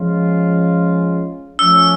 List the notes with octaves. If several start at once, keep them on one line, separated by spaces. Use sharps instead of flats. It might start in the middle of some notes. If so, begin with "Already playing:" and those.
Already playing: F3 G#3 C#4 F4
F3 A3 C#4 E6